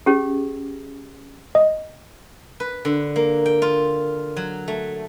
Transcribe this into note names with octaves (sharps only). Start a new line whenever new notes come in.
C#4 G4 G#4
D#5
B4
D3
A#3
G5
F4
F#3
A3